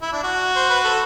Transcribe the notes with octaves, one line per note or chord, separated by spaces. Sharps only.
E4
D4
F#4
C5
B4
A4